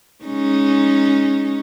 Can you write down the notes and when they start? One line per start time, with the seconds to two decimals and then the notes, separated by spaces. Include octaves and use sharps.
0.25 G#3 C#4 D#4